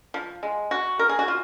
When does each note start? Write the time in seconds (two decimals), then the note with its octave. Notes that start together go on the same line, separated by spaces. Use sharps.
0.14 F3
0.43 G#3
0.71 F#4
0.99 A#4
1.09 G#4
1.19 F#4
1.28 F4